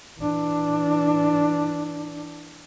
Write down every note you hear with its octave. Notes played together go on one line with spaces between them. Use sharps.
E3 D4